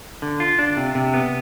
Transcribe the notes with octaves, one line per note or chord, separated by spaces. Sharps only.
D3
F4
D4
C3
C3
B3